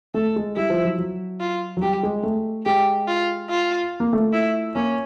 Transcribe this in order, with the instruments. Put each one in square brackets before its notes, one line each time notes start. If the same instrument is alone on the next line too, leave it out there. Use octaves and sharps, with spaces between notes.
[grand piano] A3 [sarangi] A4
[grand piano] G#3
[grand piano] G3 [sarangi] E4
[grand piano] F3
F#3
F#3
[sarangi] F4
[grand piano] F#3
[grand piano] G3 [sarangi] G4
[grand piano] G#3
A3
[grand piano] G#3 [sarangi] G4
[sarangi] F4
F4
[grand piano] A#3
A3
[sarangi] E4
[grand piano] A#3 [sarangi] C#4